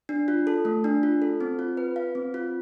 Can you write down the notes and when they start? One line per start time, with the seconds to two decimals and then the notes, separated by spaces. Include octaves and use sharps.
0.09 D4
0.28 F4
0.47 A4
0.65 A3
0.84 D4
1.03 F4
1.22 A4
1.41 C4
1.59 F4
1.77 B4
1.96 F5
2.15 C4
2.34 F4